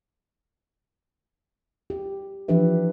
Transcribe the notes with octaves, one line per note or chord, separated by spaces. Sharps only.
G4
E3 F3 D4 G4 B4 E5